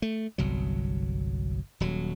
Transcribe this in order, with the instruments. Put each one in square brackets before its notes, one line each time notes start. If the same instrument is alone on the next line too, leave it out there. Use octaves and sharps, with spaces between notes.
[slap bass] A3
G1 C2 F#3
D#1 F#3